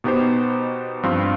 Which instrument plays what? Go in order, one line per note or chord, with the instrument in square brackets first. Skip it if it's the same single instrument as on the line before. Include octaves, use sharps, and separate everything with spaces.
[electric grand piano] B2 B3 D#4 G4 C5
G2 F3 C4 F4